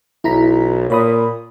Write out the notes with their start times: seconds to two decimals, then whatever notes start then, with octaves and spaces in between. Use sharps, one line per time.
0.24 B1 E4 A#5 B6
0.90 A#2 C#5 B5 D#6